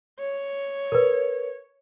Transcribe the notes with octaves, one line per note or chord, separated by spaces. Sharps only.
C#5
A#4 B4